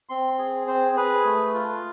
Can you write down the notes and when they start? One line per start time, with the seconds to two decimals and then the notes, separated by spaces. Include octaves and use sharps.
0.09 C4 C6
0.38 G#4
0.67 C4 C5
0.96 G#4 B4
1.25 A3
1.54 F4